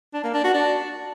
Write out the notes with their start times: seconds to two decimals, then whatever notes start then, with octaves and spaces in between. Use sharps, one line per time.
0.13 D4
0.24 A#3
0.34 D4
0.44 F#4
0.54 D4